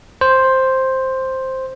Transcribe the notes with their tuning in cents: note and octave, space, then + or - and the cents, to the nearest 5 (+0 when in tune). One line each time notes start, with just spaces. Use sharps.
C5 +5